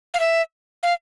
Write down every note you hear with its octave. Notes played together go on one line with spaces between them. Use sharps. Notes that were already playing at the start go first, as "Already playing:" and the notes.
F5
E5
F5